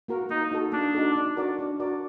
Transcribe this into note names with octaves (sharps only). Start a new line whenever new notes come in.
A#3 F#4 A#4
A#3 D#4
D#4 F#4 A4
A#3 D4
D#4 F#4 A4
D4
F#4 A#4 D5
D4
F#4 A#4 D5